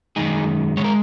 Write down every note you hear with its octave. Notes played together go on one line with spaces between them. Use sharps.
F#2 D#3 G#3 D#4 G#4
D#3 G#3 C#5
A#4